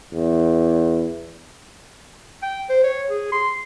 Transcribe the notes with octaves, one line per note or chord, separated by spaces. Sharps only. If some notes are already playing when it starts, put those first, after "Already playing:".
E2
G5
C5
C#5
G#4
C6